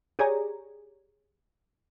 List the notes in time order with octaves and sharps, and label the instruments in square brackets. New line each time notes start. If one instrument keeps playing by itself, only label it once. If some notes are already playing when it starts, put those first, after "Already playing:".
[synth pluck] G4 G#4 C#5 D5 G#5 A#5